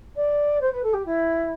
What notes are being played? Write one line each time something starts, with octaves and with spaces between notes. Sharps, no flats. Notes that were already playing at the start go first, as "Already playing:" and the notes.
D5
C5
B4
A4
G4
E4